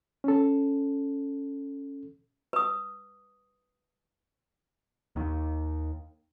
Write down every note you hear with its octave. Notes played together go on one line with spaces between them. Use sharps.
C#4 A4
B4 D#6
D#2 D#3